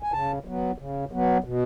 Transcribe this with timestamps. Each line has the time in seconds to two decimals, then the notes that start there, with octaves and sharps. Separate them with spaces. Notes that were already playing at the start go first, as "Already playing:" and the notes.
0.03 G#5
0.12 C#3 A5
0.45 F#3 B3
0.78 C#3
1.12 F#3 B3
1.44 B2